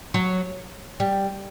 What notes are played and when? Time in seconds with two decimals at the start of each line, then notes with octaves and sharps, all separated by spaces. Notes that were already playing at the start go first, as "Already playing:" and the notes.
0.14 F#3
1.00 G3